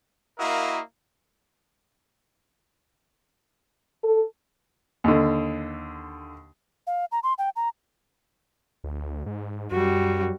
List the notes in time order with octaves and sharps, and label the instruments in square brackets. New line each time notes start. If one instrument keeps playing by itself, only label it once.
[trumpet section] A#3 E4 F#4 A#4 D#5 F5
[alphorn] A4
[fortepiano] D#2 D3
[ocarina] F5
A#5
C6
G5
A#5
[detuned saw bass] D2
G#2
[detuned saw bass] F#2 [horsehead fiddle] G3 F#4